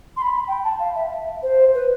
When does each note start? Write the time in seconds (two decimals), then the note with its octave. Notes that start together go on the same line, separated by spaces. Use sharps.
0.16 C6
0.21 B5
0.48 G5
0.64 A5
0.79 F5
0.95 E5
1.42 C5
1.74 B4